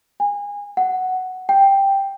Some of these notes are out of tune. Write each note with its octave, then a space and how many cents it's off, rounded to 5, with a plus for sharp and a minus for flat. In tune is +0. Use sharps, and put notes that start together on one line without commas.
G#5 -30
F#5 +5
G5 +5